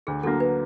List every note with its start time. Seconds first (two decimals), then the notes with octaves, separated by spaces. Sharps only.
0.07 D2 G#4
0.23 D3 F#3 A#3 A4
0.40 B4